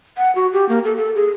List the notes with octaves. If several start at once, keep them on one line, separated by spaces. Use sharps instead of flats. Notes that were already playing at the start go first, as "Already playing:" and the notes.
F#5
F#4
G4
A#3
A4
A4
G#4